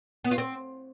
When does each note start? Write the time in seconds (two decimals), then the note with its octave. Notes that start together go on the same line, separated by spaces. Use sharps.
0.25 B3
0.31 F4
0.38 C4